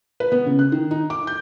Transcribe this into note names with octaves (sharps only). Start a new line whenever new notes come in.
B4
B3
C#3
F#6
D#3
D#4
D6
G6